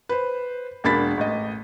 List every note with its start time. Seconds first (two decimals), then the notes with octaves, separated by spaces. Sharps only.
0.09 B4 C5
0.84 E1 A#3 D4 B5 A6 B6
1.17 A1 D#5